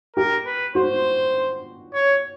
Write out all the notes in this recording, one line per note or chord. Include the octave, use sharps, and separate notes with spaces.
G4 A#4
B4
F#4 C5
C#5